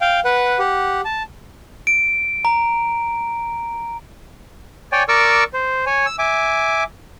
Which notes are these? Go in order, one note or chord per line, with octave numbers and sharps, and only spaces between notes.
F5 G5
B4 F#5
G4 F#5
A5
D7
A#5
C#5 D5 G5 G#5
A#4 D5 C#6 D6 E6
C5
C#5 G#5
E6
E5 G#5 D6